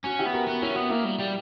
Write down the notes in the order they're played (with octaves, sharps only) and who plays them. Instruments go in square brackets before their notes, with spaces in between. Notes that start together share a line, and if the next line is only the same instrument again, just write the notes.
[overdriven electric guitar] C#4 [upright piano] F#4
[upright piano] E4 G4
[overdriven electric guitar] B3
[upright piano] F#4 A#4
[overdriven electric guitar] B3 [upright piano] F#4
[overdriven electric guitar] C#4 [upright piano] E4
[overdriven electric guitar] B3 [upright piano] F#4
[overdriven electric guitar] A#3 [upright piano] E4
[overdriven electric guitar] G3
G3